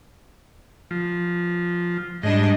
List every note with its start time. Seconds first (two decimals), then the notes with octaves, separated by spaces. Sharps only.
0.91 F3
2.23 G#2 G3 D4 D#5